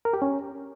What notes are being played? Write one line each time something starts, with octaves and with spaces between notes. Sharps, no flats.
A#4
G4
C#4